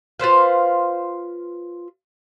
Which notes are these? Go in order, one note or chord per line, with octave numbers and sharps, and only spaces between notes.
F4 B4 C5 F5